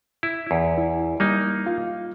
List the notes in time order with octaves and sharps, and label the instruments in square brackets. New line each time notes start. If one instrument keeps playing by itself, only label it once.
[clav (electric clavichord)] E4
E2
[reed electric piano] E4
[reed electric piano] G3 [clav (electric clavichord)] A#3 D#4
[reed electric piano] F4 F5